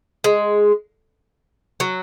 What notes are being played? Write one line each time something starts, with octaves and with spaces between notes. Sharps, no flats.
G#3
F#3